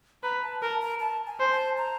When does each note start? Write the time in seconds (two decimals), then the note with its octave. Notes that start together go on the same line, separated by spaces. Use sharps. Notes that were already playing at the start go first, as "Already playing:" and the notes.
0.23 B4 A#5
0.43 A5
0.61 A#4 A5
0.81 A#5
1.00 A5
1.27 G#5
1.40 C5
1.51 A5
1.77 A#5